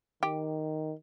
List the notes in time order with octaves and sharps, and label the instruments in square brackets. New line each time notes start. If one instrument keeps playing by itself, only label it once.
[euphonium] D#3 [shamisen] G4